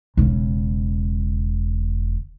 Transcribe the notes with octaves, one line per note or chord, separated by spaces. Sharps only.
E1 C#3